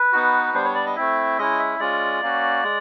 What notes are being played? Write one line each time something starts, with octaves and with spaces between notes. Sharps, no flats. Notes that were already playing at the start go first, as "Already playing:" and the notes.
Already playing: B4
B3 D#4 F#4
G3 B3 D4 C5
C#5
D5
D#5
A3 C4 E4 E5
G#3 C#4 E4 D#5
E5
G#3 C#4 F4 D5
A#3 C#4 F#4
G#3